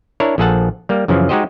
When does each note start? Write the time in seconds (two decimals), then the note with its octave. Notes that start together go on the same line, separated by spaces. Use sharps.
0.20 D4 E4 A#4 C#5
0.38 A#1 F3 G#4 A4 F#5 A5
0.89 G3 A#3
1.08 F#2 C#3 E3 F3
1.29 G#3 D#4 F#4 G4 C5 D#5